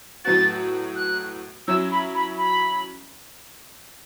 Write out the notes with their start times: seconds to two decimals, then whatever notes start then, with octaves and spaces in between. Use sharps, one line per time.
0.25 A2 F#3 B3 F#4 A6
0.96 F#6
1.68 F#3 C#4 E4 E6
1.91 B5
2.15 B5
2.38 B5